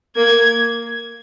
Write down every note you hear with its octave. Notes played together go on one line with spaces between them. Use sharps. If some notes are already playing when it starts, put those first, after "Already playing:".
A#3 G#6